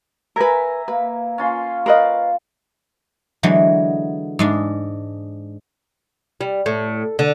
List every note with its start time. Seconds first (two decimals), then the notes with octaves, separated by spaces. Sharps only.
0.36 A#4 B4 E5 G#5 A#5
0.88 A#3 B4
1.38 C#4 F4 C6
1.86 A#4 B4 D#5 F5
3.43 D3 E3 F#3 G#3
4.39 G#2 G#3 D4
6.41 G3
6.66 A2
7.19 D3